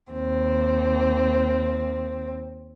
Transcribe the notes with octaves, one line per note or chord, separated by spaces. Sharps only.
D#2 C4